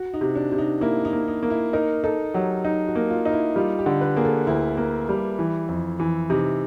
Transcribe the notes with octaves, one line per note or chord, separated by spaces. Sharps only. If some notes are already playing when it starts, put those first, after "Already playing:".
Already playing: F#4
D#4
C3
D4
C3
D#4
A#3 E4
D#4
A#3
D#4
A#3
E4
D#4 A#4
D#4 A4
F#3 G4
D#4
F#4
A#3
F4
D#4
E4
G3 F4
G4
D3
B4
A#3 G#4
A4
D2 E4
A#3
G3
E3
F2
E3
C3 D#4